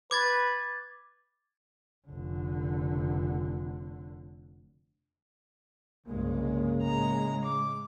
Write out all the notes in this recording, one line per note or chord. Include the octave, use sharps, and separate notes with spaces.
B4 D6 G#6 A6
F1 D3
C2 G2 C#3 G#3 A#3
A2 G#3 A#5
D6